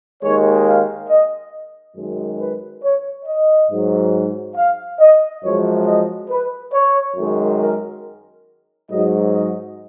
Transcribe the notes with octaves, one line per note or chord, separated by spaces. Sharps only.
D#2 D#3 G#3 C#5
F5
D#5
F#2 D#3 G#3
B4
C#5
D#5
G#2 F#3
F5
D#5
F#2 F3 G#3 C#5
D#5
B4
C#5
F#2 D#3 G#3
A#4
G#2 F#3 D#5
D#5